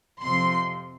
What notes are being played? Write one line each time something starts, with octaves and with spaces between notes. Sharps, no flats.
F2 C3 F3 C6